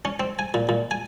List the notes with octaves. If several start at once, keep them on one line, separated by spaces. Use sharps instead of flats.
C#4
C4
G#5
A#2
A#2
G#5